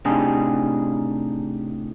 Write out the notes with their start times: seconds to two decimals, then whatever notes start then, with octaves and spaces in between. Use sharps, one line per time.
0.05 A2 C3 D4 D#4 G4 G#4